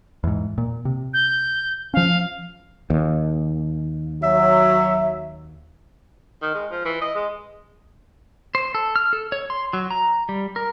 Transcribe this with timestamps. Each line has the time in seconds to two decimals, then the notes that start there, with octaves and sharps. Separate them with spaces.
0.24 E2 G#2
0.58 A#2
0.85 C3
1.14 G6
1.94 F3 C#4 F5
2.90 D#2
4.23 F#3 E5
6.42 D#3
6.54 G#3
6.71 F3
6.85 E3
7.01 D#5
7.15 G#3
8.55 C5
8.75 A4
8.96 F6
9.13 A4
9.32 C#5
9.50 C6
9.73 F#3
9.91 A#5
10.29 G3
10.56 A#4